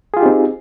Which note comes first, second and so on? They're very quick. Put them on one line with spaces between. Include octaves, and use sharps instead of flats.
G#4 F4 G4 D#4 C4